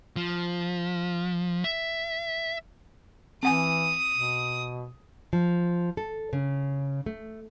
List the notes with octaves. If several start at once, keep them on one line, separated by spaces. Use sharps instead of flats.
F3
E5
E3 C4 F#5 G#5 D#6
B2
F3
A4
C#3
A3